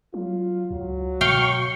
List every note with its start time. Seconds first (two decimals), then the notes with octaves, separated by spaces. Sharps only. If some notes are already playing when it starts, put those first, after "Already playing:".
0.14 F#3 F4
0.71 C#2 F#3
1.21 B2 F5 G5 C#6